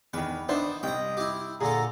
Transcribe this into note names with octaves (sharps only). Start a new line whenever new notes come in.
E2 D#3 B4
B3 D4 D#4 C5 E5
C2 D#5 G5 A#5
E4 G4
A#2 D3 G#4 A4 A#5